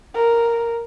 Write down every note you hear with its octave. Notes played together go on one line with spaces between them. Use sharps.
A#4